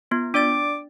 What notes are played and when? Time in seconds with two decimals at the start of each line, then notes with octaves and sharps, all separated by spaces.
0.11 B3 F4
0.34 D4 D5 D6 A6